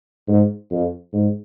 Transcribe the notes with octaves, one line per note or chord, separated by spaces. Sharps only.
G#2
F2
G#2